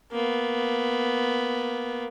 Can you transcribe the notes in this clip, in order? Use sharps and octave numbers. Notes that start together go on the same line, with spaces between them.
A#3 B3